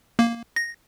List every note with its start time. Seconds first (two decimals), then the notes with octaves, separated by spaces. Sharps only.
0.19 A#3
0.56 A#6